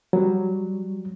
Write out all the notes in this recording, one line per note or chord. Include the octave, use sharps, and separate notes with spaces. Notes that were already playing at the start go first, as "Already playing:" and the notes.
F#3 G3